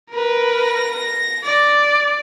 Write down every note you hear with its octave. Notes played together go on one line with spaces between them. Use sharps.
A#4 B4
A#6
D5